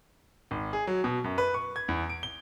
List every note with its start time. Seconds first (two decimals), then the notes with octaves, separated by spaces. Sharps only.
0.51 G#1
0.73 G#4
0.87 F#3
1.04 B2
1.24 F#2
1.38 B4
1.54 C#6
1.76 G#6
1.88 E2
2.10 D7
2.23 G7